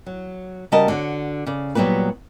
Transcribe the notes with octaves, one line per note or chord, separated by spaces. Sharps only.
F#3
C#3 G3 F#4 A#4 D#5 A5
D3 F#4 C#5
C#3 D5
A#2 F#3 G3 B3 F#4 B4